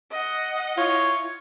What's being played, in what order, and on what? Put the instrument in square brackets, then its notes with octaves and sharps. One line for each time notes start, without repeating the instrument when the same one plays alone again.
[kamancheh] D#5 F#5
[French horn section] E4 [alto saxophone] F4 [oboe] C#5